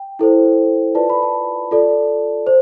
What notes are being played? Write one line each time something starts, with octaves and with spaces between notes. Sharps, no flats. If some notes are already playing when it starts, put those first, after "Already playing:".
Already playing: G5
E4 A4 C5
F4 B4 D5 A5
B5
A5
F4 A4 D5
C5